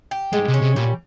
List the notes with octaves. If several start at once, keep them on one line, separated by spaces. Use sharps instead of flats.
G4
G#2 G#3
C3
C#4
C3
A#2 G3